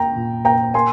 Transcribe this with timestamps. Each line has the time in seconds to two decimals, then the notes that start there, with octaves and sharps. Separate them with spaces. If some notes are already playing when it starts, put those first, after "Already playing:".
Already playing: A#3 G5 A#5
0.16 A#2
0.45 A#3 G5 A#5
0.74 A#3 G#5 C6